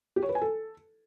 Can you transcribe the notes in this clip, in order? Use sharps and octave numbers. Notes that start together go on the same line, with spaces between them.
G4
C#5
B4
G#5
A4